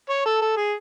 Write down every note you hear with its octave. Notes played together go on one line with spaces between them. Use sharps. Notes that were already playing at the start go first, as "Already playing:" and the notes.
C#5
A4
A4
G#4